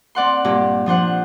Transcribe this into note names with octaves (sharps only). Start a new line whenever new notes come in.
C4 D5 F#5 C6
G2 A#2 C4 G4
F3 D4 C5 F#5